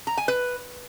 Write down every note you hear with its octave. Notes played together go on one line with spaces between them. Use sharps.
A#5
G#5
B4